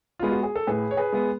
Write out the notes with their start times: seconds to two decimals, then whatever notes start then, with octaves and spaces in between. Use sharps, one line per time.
0.19 G#3 B3 F4
0.31 F#4
0.43 G#4
0.56 A4
0.67 A2 G#4 B4
0.91 C#5
0.97 G#4 B4
1.12 G#3 B3